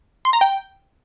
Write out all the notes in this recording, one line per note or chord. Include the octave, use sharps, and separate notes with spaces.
C6
A#5
G5